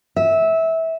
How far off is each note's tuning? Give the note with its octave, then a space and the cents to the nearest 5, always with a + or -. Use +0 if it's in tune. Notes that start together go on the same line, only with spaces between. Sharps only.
E5 -20